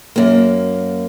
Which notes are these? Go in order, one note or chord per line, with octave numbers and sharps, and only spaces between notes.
F#2 A#3